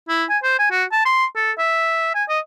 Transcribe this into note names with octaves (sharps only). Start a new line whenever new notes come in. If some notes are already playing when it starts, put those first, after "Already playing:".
E4
G#5
C5
G#5
F#4
A5
C6
A4
E5
G#5
D#5